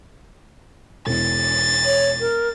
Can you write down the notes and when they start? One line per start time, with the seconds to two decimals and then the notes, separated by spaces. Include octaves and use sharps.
1.07 E1 E2 A6
1.85 C#5
2.20 A#4